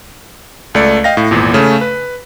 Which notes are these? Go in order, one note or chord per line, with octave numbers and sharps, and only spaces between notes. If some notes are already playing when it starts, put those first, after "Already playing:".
C#2 A3 D5 C#7
D#5 F5 G5 A#6
A2
G#1 E2 A#2
C#3 A3 C#4
B4